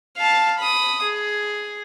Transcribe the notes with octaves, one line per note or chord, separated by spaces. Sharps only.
F5 A5
B5 D#6
G#4